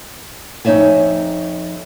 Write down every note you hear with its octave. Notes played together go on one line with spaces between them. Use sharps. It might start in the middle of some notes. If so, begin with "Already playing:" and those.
F2 D#4 C#5 D5 E5 G#5